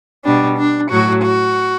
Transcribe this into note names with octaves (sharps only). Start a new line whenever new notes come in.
B2 G3 D4
D4
A2 F#3 F#4
F#4